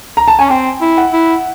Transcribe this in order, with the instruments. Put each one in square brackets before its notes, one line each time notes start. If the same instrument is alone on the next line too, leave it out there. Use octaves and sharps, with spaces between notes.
[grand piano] A#5
A5
[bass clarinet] C#4 [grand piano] G#5
[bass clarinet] C4 [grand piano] G5
[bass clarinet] E4
[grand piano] F#5
[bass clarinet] E4